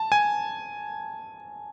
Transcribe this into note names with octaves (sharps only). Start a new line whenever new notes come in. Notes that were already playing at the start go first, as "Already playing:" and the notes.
Already playing: A5
G#5